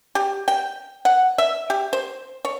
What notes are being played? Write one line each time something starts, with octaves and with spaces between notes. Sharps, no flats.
G4
G5
F#5
E5
G4
C5
C#5